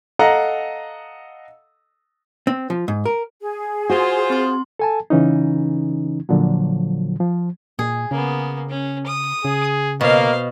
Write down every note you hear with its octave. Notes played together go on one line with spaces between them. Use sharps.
A4 D#5 F5 F#5 A#5
C4
F3
G#2
A#4
G#4
F4 F#4 C5
C4 C6
A4 G#5 A5
C#3 E3 C#4 D#4
A#2 D3 F3 F#3
F3
A#2 G#4
C#3 A#3 B3
C#4
D#6
C#3 G#4
B2 A#3 C5 F5